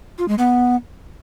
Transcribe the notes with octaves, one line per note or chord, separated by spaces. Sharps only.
F4
G#3
B3